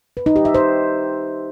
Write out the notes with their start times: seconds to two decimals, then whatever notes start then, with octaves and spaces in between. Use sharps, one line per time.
0.17 B4
0.26 D#4
0.36 G4
0.45 E5
0.55 C5